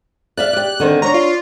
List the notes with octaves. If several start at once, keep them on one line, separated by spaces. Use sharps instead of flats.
D5 E5 F5 F#6
G4 D5
D3 D#3 C4
D4 C#5 A#5
F4